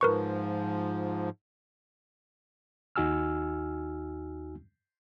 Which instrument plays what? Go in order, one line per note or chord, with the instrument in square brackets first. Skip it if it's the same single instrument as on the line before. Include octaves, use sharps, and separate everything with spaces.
[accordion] G#2 F3 [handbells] A#4 B4 C#6
[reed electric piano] D#2 D#4 F#4 G#5 E6 F6